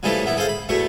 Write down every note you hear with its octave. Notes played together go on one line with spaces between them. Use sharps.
C#3 E3 F3 G3 A3 D4
A#1 B3 E4
G#4 A4 C5 F5
B5
E2 B2 A3 C#6